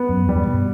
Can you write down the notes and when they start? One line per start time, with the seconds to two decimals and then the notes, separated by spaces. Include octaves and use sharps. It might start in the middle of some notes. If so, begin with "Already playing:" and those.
Already playing: B3
0.09 F#2
0.27 E2 G2 G3
0.47 G2 B2